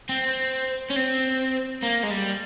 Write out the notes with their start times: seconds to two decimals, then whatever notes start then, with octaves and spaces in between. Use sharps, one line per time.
0.09 C4
0.90 C#4
0.96 C4
1.83 A#3
2.03 G#3
2.10 G3